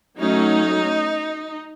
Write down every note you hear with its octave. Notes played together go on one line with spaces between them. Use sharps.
F#3 A3 C#4 D#4